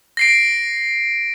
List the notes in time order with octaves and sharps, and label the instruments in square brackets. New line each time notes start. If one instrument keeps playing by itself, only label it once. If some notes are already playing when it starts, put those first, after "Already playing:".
[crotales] A#6 C7 D7